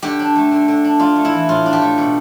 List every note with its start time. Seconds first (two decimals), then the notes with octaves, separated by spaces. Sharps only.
0.02 D3 G4
0.19 D4
0.36 A3
0.51 D3
0.68 D3
0.84 D4
1.00 D4 F4
1.16 A3
1.25 E4
1.33 E3
1.49 A2 F4
1.66 D4
1.73 G4
1.82 A3
1.98 B2